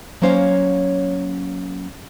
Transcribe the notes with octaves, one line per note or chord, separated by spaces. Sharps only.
F#3 A#3 C#4 C5 C#5 F5